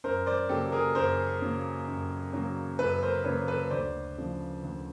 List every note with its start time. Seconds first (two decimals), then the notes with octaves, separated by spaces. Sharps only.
0.04 F#2 A#4 C5
0.26 C5 D5
0.49 C#3 F#3 A#3 G4 A4
0.72 G#4 A#4
0.95 F#2 A#4 C5
1.42 C#3 F#3 A#3
1.88 F#2
2.33 C#3 F#3 A#3
2.79 F#2 A4 B4
3.03 A#4 C5
3.24 C#3 F#3 A#3 B4 C#5
3.48 A4 B4
3.70 D2 C5 D5
4.17 C#3 F3 A3
4.63 D2